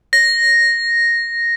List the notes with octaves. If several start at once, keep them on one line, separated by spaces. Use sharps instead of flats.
A#6